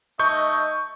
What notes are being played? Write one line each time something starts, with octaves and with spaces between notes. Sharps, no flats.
A3 D#4 D#5 C#6 G6